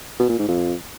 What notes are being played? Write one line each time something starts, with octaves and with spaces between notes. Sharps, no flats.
B2
A#2
G#2
F2